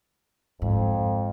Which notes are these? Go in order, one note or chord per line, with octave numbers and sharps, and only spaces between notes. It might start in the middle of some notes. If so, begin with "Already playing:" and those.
F2 G#2